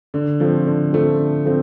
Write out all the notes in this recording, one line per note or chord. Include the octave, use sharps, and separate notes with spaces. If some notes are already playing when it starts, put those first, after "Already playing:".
D3
F3 A3 C4
D3
F3 A3 C4
D3
F3 A3 C4